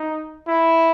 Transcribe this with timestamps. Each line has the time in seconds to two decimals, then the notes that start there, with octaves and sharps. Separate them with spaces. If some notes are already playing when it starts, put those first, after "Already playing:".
Already playing: D#4
0.47 E4